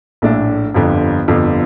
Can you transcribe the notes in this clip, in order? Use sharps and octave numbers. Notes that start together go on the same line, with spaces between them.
A#1 A2 A3 D4
G1 F2 D3
G1 F2 D3